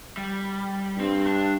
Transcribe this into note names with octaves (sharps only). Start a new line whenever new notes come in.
G3
G2 C4
D4